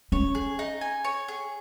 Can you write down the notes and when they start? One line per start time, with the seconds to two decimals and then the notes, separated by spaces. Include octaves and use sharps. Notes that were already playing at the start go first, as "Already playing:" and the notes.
0.12 C#4 C#5
0.35 G#4
0.59 D#4
0.81 G#5
1.04 C#5
1.28 G#4